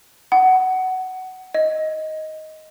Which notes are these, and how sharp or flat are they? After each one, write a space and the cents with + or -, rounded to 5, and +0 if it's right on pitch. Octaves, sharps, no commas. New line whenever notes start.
F#5 +15
D#5 +5